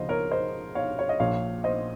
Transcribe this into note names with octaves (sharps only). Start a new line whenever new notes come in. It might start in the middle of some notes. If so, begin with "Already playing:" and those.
Already playing: C#2 C#3 F3 C5 D#5 F5
A#4 C#5
C5 D#5
C#5 F5
C#5
D#5
A#1 A#2 F3 A#3 C#5 F5
C5 D#5